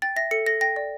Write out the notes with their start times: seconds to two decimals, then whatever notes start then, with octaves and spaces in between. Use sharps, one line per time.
0.02 G5 A6
0.16 E5 A#6
0.31 A4 C#7
0.46 A4 A#6
0.61 G5 A#6
0.76 D5